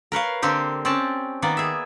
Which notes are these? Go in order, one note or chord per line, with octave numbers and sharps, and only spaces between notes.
A#4 B4 C#5 F5
D3 A#3 C4 G4
C4 C#4 D5 G5 A5
D#3 A#3 B3 D5
G#4 E5